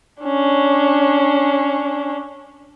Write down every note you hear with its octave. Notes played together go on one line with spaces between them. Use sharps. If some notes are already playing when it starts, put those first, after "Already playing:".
C#4 D4